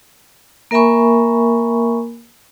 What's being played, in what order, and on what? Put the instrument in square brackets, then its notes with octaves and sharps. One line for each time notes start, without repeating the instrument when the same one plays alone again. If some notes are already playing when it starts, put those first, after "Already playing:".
[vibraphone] A#3 A#4 E5 G#5 B5 C#6